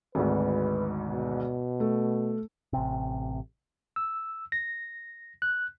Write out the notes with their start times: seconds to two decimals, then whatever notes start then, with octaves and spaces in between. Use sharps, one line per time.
0.15 G#1 D2 G#2 B4
1.06 B2
1.80 A3
2.73 A1 C3
3.96 E6
4.52 A#6
5.42 F#6